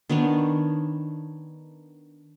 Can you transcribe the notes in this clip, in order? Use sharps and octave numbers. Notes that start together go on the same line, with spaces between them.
D#3 B3 D4 C#5